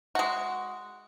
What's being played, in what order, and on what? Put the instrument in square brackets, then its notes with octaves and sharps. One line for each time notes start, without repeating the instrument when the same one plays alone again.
[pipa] G#3 F#4